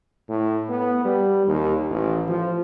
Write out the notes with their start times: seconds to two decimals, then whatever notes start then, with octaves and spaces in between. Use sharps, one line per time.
0.29 A2
0.69 B3
1.05 G3
1.47 D#2
1.90 A1
2.28 F3